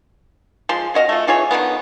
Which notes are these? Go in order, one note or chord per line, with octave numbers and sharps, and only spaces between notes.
F3 G#3 C6
C#4 F#4 D#5 F5
A3 F4
E3 F4 G#4 C#5
D3 D#3 F3 B3